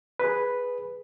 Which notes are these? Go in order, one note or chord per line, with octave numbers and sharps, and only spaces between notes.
G#4 B4